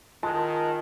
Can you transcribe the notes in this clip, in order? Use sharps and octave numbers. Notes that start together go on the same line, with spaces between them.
D#3 G#3 F4 A#4 A5